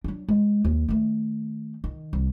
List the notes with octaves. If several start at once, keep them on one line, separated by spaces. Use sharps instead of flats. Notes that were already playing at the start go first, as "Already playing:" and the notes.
F#3 D4
G#3
D#2
D#3 A3
D#3
C2